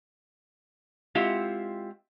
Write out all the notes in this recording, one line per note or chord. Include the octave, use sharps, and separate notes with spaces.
G#3 C4 E4 F4 G4 F#5